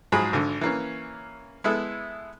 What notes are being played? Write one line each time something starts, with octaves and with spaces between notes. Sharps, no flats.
G#2 F3 F#3 G#3 G#4 B5
G#1 D3
E3 A#3 C#4
G#3 B3 E4 A4